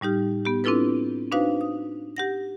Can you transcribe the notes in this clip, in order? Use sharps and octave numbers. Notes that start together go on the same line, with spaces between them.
A2 G3 D#4 G4 F6
B3 G4
C4 D4 E4 F4 A4 B4
D4 D#4 F#4 B4 C5 F5
D#6
G4 F#5 A#6